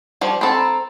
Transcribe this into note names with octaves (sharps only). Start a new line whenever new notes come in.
F3 G3
C4 A4 B5
A#5